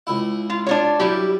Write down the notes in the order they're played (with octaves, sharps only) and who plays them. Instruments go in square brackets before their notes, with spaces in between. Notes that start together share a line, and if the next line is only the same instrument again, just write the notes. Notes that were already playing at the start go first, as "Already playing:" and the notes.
[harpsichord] C#2 E4
[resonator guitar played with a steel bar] F4
D4 F4 C#5
[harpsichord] F#3 [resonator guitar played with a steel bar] G3 E4 G4